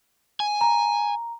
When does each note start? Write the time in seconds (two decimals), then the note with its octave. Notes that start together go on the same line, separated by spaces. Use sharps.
0.40 G#5
0.61 A#5